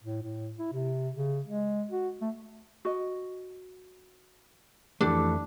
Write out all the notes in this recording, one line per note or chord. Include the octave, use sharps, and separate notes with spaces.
A2
A2
E4
C3
C#3
G#3
F#4
A3
F#4 D#5
F2 E3 A3 D4 G4 A4